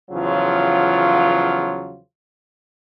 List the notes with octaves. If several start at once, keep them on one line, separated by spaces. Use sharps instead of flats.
E2 C#3 F3 F#3 F4